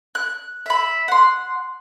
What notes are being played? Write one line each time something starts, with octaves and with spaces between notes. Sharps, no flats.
F#6
E5 B5
F#5 C6